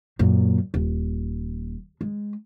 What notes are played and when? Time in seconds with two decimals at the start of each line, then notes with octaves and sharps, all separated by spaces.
0.19 F#2 A#2
0.74 D#1
2.01 G#3